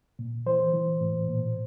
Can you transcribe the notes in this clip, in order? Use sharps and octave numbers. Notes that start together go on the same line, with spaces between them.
A#2
E3 C5
E3
A2
A#2